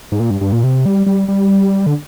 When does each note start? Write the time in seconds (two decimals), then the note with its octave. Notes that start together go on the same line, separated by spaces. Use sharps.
0.12 G#2
0.20 A#2
0.30 G2
0.41 G2
0.52 A#2
0.64 C3
0.86 G3
1.06 G3
1.28 G3
1.86 D3